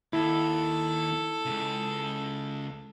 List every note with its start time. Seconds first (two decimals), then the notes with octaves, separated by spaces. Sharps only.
0.13 D#2 E4 A4
1.46 C#2 C#3